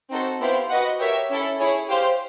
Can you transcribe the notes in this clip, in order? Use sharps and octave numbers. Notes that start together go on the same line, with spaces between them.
C4 D#4 F#4 A4 C5
B3 E4 G4 C5 F5
F#4 B4 D#5 F#5
G4 A#4 C#5 E5
C#4 E4 A4
E4 G#4 C#5
G4 C5 F5